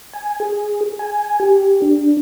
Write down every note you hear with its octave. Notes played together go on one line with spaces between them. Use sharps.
G#5
G#4
G#5
G4
D4